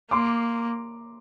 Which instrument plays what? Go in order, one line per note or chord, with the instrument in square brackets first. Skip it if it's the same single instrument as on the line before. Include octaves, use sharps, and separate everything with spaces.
[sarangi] A#3 [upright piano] C6 D6